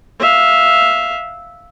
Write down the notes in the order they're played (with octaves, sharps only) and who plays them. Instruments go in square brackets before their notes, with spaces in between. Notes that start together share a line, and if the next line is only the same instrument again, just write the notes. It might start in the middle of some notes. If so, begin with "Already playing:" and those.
[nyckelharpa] E5 F5